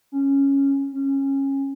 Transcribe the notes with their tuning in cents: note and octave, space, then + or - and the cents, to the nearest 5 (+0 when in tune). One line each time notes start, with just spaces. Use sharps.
C#4 -5
C#4 -20